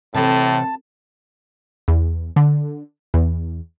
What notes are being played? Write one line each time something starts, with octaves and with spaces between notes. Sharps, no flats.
A2 C3 E3 A4 A5
E2
D3
E2